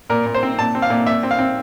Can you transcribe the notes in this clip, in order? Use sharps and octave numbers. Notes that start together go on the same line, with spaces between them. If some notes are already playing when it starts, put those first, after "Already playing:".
A#2 A#4
A#2
C5
C4
A#2 A5
C4
F5
A#2
A#2 E5
C4
F5
C4